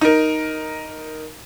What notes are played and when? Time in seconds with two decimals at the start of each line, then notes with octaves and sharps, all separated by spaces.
0.01 D#4 A#4